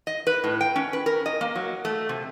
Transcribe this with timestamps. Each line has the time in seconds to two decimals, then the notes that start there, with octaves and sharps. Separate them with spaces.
0.07 D#5
0.27 B4
0.44 A2
0.61 G5
0.76 C#4
0.93 B4
1.06 A#4
1.26 D#5
1.41 A#3
1.55 F#3
1.85 A3
2.09 C3